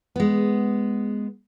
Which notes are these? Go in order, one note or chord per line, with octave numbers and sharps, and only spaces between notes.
G#3 B3